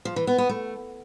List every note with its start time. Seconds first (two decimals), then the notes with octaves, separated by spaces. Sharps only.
0.05 F3
0.16 E3
0.27 B3
0.38 B3
0.49 A3